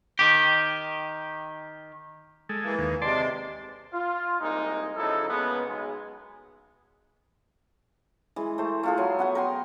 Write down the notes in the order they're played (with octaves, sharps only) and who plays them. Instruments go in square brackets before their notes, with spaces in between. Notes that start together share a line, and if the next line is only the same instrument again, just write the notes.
[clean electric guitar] D#3 G4
[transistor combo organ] G#3 A4
[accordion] E3 A#3
[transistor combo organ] D#2
[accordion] C3 G#3 [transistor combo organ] D5 A5 C6
[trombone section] F4
C2 G#3 A#3 D#4
C#3 F3 F#3 D#4 E4 A4
C#3 G#3 A#3 B3
B1 G#3
[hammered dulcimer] E3 G#3
A3 C5
A3 F4 G#4
F#3 C6
B3 F#5 G#5
A#4 G5 C6